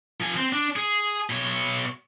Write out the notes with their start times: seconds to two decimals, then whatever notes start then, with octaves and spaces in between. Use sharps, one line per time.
0.20 F3 G#5
0.37 C4
0.53 D4
0.76 G#4
1.30 B2 C#5